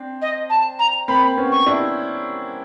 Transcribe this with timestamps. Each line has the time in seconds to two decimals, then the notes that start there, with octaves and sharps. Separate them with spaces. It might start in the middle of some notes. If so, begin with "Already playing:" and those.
Already playing: C4 D4
0.22 D#5
0.50 A5
0.79 A#5
1.08 A#3 C4 B5
1.37 B3 C#4
1.52 C#6
1.66 D4 E4